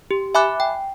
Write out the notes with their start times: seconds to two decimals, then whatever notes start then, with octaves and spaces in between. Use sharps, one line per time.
0.11 G4
0.35 E5 G#5 B5 D6 F#6
0.60 G5